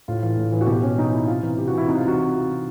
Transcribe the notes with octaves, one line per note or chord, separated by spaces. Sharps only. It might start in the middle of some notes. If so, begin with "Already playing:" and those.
A2 F4
E3 F4
A2
E3
F#4
B2 G4
C#4
B2 D#4
E4
C3 F4
E3
C3 G4
F#4
E3
E4
C3 D#4
F4
E3
F#4